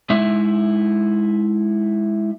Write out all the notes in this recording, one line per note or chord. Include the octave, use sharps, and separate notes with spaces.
G#3 D#4 E4 E5